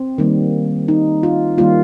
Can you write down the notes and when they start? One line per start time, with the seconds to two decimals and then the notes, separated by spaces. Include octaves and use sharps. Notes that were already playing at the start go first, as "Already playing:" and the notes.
Already playing: C4
0.18 D#3 G3 A#3
0.88 D#4
1.23 F4
1.58 D#3 G3 A#3 F4